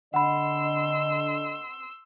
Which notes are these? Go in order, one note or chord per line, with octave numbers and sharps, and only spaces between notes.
D3 D#5 F#5 B5 C6 E6